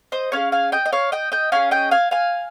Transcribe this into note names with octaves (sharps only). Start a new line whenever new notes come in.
C5 D#5
C#4 G#4 C#5 F5
F5 G#5
D#5 G5
D#5
C#5 F5
D#5 G5
D#5 G5
C#4 F4 G#4 F5 G#5
D#5 G5
F5 G#5
F5 G#5